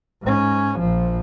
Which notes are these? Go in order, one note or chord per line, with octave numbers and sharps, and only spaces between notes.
G#2 C#4
A#1 F3